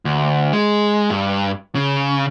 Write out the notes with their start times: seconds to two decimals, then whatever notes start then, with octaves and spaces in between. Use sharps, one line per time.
0.05 D2
0.53 G#3
1.10 G2
1.75 C#3